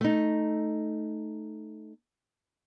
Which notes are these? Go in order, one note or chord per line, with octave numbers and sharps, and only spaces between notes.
A3 D#4